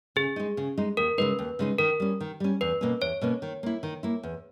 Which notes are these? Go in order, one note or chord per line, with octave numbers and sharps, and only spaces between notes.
C#3 G#4
G#3 D#4
C#3
G#3 D#4
D#2 A#4
C#3 G#3 D#4 B4
D#2
C#3 G#3 D#4
D#3 A#4
G3 C#4
D#3
G3 C#4
E2 B4
B2 A#3 C#4
E2 C#5
B2 A#3 C#4
D#3
A#3 E4
D#3
A#3 E4
E2